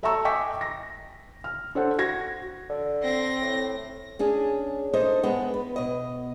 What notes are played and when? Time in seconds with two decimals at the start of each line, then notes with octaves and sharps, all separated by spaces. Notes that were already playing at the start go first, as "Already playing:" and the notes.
0.03 A4 E5 A5 A#5 C#6 E6
0.25 D#5 G5 G#5 C#6 D6 B6
0.61 A#6
1.44 F6
1.75 D4 A4 C5 F#5
1.98 F#4 G#6 A#6
2.69 D3
3.02 C4 A#6
3.41 A2
4.19 C#4 D4 G#4
4.93 D4 D#4 A4 C5 D#5
5.23 G#3 B3 D4
5.54 B4
5.76 B2 D#5